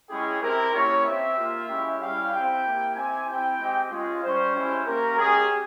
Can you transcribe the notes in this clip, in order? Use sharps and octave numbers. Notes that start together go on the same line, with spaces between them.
G#3 C#4 E4 G4 G#4
C4 E4 G4 A#4
A#3 C#4 E4 G4 C#5
C4 G4 E5
A#3 F4
G#3 C#4 E4 G4
G3 C#4 E4 G4 F5
C4 E4 G4 G5
A#3 E4 G4
C4 E4 G4 G#5
C4 E4 G4 G5
G#3 C4 G4
G#3 C#4 F4
G3 C#4 G4 C5
G#3 C#4 E4 G4
A#3 C#4 G4 A#4
G#3 C#4 G4 G#4